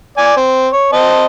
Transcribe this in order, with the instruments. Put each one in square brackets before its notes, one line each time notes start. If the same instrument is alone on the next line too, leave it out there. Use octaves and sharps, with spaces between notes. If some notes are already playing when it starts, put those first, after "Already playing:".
[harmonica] D5 G#5
C4
C#5
C4 D#5 A5